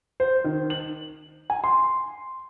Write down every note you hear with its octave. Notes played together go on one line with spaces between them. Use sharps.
C5
D#3
F#7
G#5
C6